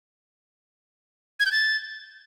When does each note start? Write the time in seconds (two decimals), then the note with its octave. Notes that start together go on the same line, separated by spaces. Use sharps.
1.40 G#6
1.46 G6
1.52 A6